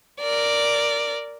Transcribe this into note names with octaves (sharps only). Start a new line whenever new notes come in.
A#4 D5